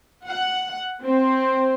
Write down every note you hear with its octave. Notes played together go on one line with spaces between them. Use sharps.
F#5
C4